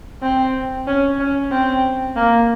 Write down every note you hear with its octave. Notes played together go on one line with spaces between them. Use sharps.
C4
C#4
C#4
C4
A#3